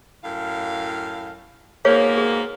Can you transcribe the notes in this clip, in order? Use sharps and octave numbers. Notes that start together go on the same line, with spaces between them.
F#2 A2 F5
G#2 B2 A#3 G#4 C#5 F5
G#4